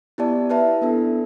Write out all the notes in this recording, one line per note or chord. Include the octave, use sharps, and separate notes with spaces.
B3 E4 G4 D5 A5
E4 B4 E5 A5
B3 D4 A4